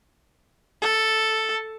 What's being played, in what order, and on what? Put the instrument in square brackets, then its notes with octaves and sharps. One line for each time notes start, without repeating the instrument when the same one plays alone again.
[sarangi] A4